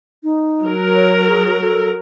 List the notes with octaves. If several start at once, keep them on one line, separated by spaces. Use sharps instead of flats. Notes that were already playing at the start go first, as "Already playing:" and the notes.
D#4
F#3 A#4
C#5
G#4
A4